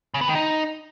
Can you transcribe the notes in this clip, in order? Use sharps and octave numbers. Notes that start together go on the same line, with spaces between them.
C#3
B3
D#3
D#4